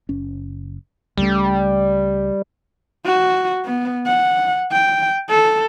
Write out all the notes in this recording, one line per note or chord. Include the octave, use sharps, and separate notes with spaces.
F#1 C#4
C#2 C#3 G3 A3
F#4
B3
F#5
G5
A4